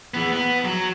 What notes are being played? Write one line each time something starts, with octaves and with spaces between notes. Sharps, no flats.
E3 B3
B3
F#3